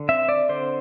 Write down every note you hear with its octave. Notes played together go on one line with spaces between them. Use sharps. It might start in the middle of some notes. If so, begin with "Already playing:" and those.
Already playing: D3
C4 E5
D5
D3 C5